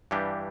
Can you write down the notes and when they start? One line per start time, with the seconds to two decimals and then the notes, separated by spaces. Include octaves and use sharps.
0.11 G2 E3 G3 D4 G4